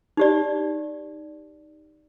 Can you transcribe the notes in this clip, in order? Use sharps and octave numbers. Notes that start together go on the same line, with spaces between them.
D#4 G4 D5